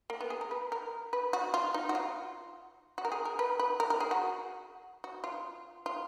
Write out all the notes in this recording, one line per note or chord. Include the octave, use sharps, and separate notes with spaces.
A#3
B3
G#4
A#4
B4
A#4
B4
F#4
F4
D#4
F#4
F4
F#4
A#4
G#4
A#4
B4
B4
A#4
A#4
G#4
F#4
F#4
F4
F4